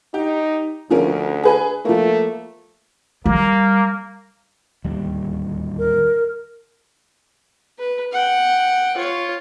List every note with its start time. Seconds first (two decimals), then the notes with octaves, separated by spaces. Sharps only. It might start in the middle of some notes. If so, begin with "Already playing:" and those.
0.14 D#4 G4
0.90 D2 F3 C#4 A#4
1.43 G#4 B4 G#5
1.85 F3 A3 A#3
3.26 G3 A#3
4.84 D1 D#2 G3
5.79 A#4
7.79 B4
8.13 F#5 G5
8.97 F4 C#5